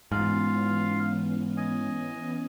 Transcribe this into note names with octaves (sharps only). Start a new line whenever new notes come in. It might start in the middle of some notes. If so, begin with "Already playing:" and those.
G#2 E3 B3 C#4 F4 F5
D#5 G#5